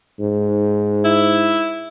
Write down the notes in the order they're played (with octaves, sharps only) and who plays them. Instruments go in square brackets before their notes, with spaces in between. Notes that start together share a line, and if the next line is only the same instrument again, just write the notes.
[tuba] G#2
[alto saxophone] E4